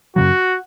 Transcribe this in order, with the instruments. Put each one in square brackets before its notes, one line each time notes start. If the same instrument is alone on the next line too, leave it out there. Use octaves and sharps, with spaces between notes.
[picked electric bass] F#2 C#3 F#3 [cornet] F#4